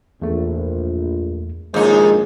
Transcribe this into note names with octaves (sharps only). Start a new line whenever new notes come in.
A#1 E2 A3
A#1 D#2 G#3 A#3 D#4 G#4 C5